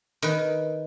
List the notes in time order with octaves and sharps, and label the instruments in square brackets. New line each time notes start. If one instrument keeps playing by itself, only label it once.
[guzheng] D#3 B4